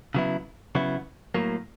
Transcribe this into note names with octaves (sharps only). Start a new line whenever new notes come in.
C#3 F#3 B3 E4
C#3 F#3 B3 E4
A2 F#3 A#3